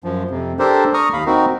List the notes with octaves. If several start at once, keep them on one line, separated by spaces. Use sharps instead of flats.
F#2 F3
F2 C3
D4 G4 A4 A#4 C5
A#5 C#6 D#6 F6
D#2 F5 B5
C4 D#4 F#4 A#4